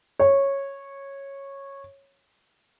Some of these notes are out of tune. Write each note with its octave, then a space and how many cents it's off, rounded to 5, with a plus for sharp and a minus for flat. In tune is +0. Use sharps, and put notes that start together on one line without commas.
C#5 -10